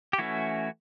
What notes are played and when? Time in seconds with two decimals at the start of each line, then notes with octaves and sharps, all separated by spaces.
0.13 G4
0.19 E3 A3 C#4 E4 F#4